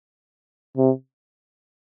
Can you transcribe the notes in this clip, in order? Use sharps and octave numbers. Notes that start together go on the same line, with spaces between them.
C3